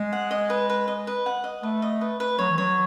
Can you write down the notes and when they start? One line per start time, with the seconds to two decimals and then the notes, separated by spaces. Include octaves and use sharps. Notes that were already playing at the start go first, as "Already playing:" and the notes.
Already playing: G#3
0.13 F#5
0.31 D#5
0.50 B4
0.70 B4
0.88 D#5
1.07 B4
1.26 F#5
1.44 D#5
1.63 A3 B4
1.82 D#5
2.01 B4
2.20 B4
2.39 F#3 C#5
2.49 E3
2.58 F#3 C#5